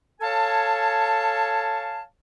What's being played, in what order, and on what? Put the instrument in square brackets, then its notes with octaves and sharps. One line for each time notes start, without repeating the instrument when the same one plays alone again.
[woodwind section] A4 C#5 F5 G#5 A5